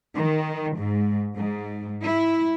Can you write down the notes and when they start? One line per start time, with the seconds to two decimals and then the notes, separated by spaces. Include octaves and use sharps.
0.16 D#3
0.78 G#2
1.36 G#2
2.03 E4